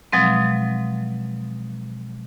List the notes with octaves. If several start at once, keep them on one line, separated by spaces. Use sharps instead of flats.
B2 F3 F#3 G#3 C4